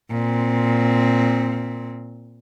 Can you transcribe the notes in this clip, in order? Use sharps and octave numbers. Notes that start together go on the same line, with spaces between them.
A#2 C4